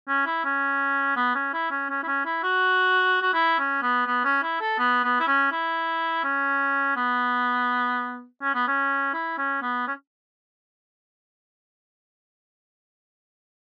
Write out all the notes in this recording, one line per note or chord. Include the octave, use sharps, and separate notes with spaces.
C#4
E4
C#4
B3
C#4
E4
C#4
C#4
E4
C#4
E4
F#4
F#4
E4
C#4
B3
B3
C#4
E4
A4
B3
B3
E4
C#4
E4
C#4
B3
C#4
B3
C#4
E4
C#4
B3
C#4